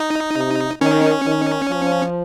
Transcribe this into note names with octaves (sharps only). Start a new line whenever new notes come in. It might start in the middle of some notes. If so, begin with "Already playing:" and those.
Already playing: D#4
C3
D#3 C#4
D#3
F3